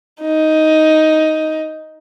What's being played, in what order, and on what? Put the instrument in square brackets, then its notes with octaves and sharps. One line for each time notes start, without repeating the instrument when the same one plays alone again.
[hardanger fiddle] D#4